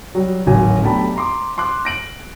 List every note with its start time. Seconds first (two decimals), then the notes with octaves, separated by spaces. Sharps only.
0.15 F#3 G3
0.46 D1 G#1 F#3 G#5
0.83 B1 A3 D4 G4 A5 B5
1.16 A#5 C6 D6
1.58 C6 D6 F#6
1.85 A#6 D7 F#7